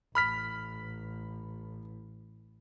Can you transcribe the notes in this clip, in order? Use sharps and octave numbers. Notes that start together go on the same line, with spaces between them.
A1 B5 F6 B6